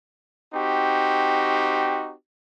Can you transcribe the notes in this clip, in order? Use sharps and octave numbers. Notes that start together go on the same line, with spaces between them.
C4 D#4 F#4 G4